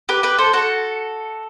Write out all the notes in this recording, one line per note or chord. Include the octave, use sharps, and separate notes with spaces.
G4 B4
G4 B4
A4 C5
F#4 A4